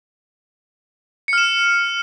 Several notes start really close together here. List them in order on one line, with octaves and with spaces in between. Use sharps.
C#7 F6 E7